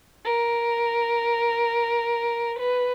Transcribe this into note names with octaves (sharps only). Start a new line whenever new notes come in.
A#4
B4